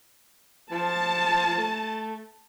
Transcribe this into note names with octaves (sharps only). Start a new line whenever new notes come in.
F3 A5
A3